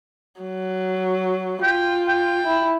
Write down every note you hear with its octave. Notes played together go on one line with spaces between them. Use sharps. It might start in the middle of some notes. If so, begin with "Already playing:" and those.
F#3
F4 G5
G5
E4